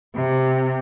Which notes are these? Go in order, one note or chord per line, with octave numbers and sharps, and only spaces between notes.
C3